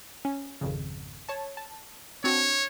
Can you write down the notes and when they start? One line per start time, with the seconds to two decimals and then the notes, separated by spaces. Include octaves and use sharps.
0.25 C#4
0.61 G#1 F2 C#3
1.29 C#5 A5
1.57 A5
2.24 C4 D4 F#4 C#5